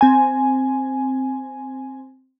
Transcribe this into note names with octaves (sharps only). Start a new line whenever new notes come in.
C4 G#5